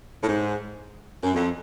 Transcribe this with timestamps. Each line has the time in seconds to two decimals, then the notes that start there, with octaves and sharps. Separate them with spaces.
0.22 A2
0.28 G#2
1.21 F#2
1.34 F2